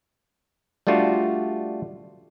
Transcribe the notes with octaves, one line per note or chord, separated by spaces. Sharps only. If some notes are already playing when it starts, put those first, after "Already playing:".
G3 A3 D4 F4 F#4